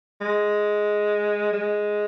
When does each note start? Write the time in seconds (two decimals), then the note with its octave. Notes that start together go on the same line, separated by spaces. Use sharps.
0.21 G#3
1.53 G#3